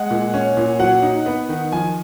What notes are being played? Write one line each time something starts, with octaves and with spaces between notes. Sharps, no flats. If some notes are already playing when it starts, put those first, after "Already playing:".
Already playing: G#3 F#5
A#2
C#4
A#2
F#3 F#5
D#4
B3
D#3
F3 G#5